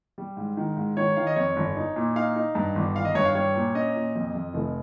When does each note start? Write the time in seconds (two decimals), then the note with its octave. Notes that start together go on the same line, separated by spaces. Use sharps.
0.18 G3
0.37 G#2
0.57 D#3
0.77 G#2
0.97 D#3 C#5
1.17 D#3 F5
1.27 D#5
1.36 F2 C#5
1.56 G1
1.76 D#4
1.96 A#2
2.16 D#4 F5
2.36 D#4
2.55 G2
2.75 G1
2.96 D#3 F5
3.05 D#5
3.15 G2 C#5
3.25 F5
3.35 G3 C#5
3.55 A#2
3.75 C#4 D#5
3.95 A#2
4.15 F2
4.35 F2
4.54 F1